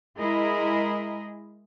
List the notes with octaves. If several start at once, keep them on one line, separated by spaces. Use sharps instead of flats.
G#3 E4 G#4 A#4 D#5